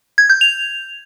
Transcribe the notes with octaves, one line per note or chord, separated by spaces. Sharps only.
G#6
G6
F7